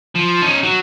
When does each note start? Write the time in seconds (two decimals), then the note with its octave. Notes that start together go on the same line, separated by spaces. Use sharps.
0.15 F3
0.41 C#4 D#4
0.63 F#3